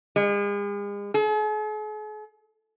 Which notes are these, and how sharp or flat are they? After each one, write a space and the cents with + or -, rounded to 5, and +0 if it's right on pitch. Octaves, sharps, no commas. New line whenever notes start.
G#3 -40
G#4 +45